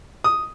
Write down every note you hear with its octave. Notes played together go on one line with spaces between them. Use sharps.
D#6